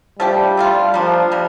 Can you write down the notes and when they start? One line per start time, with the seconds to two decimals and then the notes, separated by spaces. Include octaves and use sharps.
0.19 F3 G3 A3 D4 G4
0.57 A3 D4 F4
0.94 F3 G3 A#3 D4
1.32 C3 G3 D4